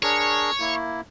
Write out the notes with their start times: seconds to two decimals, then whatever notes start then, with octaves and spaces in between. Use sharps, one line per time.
0.02 D4 G#4 A#4 C#5
0.60 A#3 E4